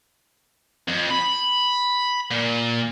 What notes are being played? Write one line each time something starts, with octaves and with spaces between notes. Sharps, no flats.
F2
B5
A#2